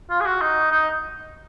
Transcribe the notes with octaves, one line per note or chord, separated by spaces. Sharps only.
F4
G#4
F#4
D#4
D#4